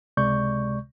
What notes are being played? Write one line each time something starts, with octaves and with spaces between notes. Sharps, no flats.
C#2 C3 G#3 D5 C#6 G6